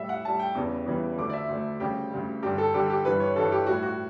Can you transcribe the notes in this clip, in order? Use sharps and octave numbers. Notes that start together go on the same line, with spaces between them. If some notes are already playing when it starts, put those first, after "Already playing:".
Already playing: A2 G3 E5
F#5
A2 G3 A5
G5
E2 C#3 E3 G3
E2 C#3 E3 G3
D2 D3 A3 D6
D5
E5
D2 D3 A3
D2 C#3 G3 G4
D2 C#3 G3
G2 D3 G3 G4
A4
G2 D3 G3 G4
G4
G2 E3 G3 B4
C#5
G2 E3 G3 A4
G4
A2 G3 F#4
F#4